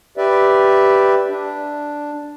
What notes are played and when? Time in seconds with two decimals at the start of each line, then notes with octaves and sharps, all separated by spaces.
0.17 G4 B4 D5 E5
1.29 D4